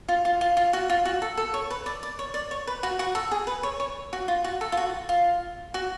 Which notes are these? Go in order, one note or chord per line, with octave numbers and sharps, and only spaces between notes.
F4
F4
F4
F4
F#4
F4
F#4
A4
A4
C#5
B4
D5
D5
C#5
D5
C#5
B4
F#4
F#4
A4
G#4
B4
C#5
C#5
F#4
F4
F#4
A4
F4
F#4
F4
F#4